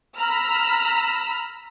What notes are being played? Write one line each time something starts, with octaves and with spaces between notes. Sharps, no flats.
A#5 B5 E6 F6